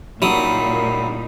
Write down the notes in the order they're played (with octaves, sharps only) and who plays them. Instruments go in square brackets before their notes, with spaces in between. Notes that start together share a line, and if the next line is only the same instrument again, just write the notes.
[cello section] A#2 D#4 [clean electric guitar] C#3 G3 E4 [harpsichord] F#3 D#6